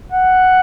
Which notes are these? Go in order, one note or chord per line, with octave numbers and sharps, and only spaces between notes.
F#5